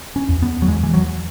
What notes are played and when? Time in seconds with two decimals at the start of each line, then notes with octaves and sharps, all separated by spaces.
0.16 C#4
0.29 E2
0.42 B3
0.62 F#3
0.68 E2 G#3
0.83 E3
0.94 F#3